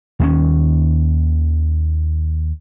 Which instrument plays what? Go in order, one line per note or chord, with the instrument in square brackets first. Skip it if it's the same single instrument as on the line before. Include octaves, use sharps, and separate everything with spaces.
[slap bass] D#2 D#3 C#4